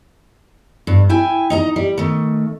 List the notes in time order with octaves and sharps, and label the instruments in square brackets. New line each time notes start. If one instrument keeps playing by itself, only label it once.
[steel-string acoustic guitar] G2
E4 G5 G#5
D#4 D#5 A#5
G3
D#3 A3